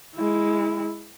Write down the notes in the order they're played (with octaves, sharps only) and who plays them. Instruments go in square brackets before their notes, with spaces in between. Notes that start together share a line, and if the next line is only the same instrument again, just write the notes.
[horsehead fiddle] G#3 E4